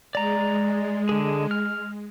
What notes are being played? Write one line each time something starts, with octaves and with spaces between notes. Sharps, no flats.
G#3 D5 A#5
D3 G#4
F6